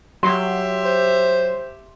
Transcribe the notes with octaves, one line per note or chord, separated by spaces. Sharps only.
F#3 G4 E5 C6
C5